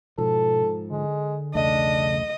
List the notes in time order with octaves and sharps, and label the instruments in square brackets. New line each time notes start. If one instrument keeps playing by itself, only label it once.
[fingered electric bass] G#2 F3 [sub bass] B2 [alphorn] A4
[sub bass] D3 [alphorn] G#3
[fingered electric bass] B1 E2 A3 [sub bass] C#3 [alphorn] D4 [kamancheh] D#5